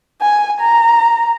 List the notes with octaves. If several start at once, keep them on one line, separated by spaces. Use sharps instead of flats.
G#5
A#5